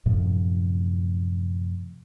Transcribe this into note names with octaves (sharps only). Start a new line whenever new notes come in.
F#2 A2 C3 F3